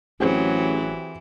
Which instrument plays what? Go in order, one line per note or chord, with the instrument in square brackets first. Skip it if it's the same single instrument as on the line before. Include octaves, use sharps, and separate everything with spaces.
[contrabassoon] A1 [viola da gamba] E3 [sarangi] F#3 [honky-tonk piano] C4 G4 G#4